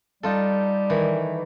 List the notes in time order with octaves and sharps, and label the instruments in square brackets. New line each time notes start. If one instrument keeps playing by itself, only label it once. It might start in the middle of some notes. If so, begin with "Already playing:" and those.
[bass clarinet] G3 [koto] D#4 F4 A4
[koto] D#3 E3